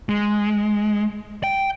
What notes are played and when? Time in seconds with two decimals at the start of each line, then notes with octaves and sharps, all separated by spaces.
0.09 G#3
1.44 G5